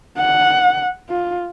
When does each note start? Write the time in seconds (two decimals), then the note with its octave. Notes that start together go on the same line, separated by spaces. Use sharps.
0.18 F#5
1.09 F4